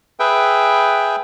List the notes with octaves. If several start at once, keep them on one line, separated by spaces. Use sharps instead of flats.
G#4 B4 E5 G5